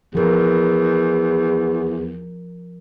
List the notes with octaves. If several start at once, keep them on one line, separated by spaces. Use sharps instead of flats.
E2 F3 A#4